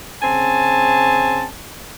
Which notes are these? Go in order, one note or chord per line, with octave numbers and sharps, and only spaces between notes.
C#3 C4 G#5 A5